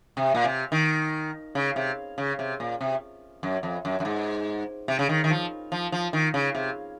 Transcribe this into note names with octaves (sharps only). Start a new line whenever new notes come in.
C3
A#2
C3
D#3
C#3
C3
C#3
C3
A#2
C3
F#2
F2
F#2
F#2
G#2
C3
C#3
D#3
D#3
F3
F3
F3
D#3
C#3
C3